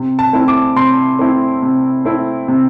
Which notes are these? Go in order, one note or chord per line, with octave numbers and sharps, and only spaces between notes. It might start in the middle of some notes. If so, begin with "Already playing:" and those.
Already playing: C3
A5
A3 C4 E4
D6
C3 C6
A3 C4 E4
C3
A3 C4 E4
C3